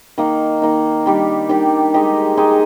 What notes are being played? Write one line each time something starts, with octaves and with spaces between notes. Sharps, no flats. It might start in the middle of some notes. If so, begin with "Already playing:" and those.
D#3 A#3 D#4
D#3 A#3 D#4
D#3 G3 D4 G4
D#3 G3 D4 G4
G#3 D#4 G4
G#3 D#4 G4